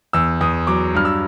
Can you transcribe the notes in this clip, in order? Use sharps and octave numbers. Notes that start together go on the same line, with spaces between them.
E2 E6
E2 D#6
F#3 D6
G2 F6
E6